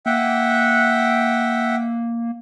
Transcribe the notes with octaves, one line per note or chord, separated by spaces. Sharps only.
A#3 E5 F#5 G5